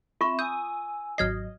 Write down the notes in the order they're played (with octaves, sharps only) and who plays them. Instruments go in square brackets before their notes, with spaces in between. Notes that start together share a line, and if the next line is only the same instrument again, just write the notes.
[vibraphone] C4 E5 [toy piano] F4 C#6
[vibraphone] G#5 E6 [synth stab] D#6 [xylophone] G6
[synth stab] G#1 F#3 D#5 [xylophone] F6 G#6 C7